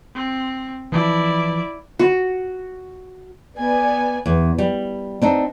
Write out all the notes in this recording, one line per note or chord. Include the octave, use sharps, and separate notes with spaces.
C4
E3 F3 E4 D5
F#4
B3 D5 G#5
E2
G3
C4 D4 D#4